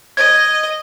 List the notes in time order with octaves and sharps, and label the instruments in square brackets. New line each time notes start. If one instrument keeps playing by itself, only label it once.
[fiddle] D#5 [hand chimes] G#6